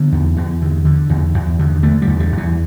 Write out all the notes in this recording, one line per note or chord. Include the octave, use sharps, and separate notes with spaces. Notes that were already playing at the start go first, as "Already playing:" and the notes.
Already playing: D3 B3
E2
E2
D3
D3
E2
E2
D3
D3 A3
G3
E2
G3
E2
E3